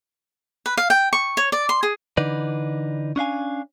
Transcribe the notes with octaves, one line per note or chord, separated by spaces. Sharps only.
B4
F5
G5
C#6
C#5
D5
C6
G#4
D3 E3 D4 D#4 B4 D5
C#4 D4 F5 G#5